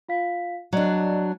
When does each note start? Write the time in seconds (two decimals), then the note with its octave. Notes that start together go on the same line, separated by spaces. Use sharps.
0.09 F4 F5 B6
0.73 F#3 D4 D5 D#5